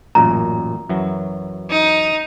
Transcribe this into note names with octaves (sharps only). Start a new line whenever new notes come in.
A1 F#2 A#2 A#5
F#2 E3 F#3
D#4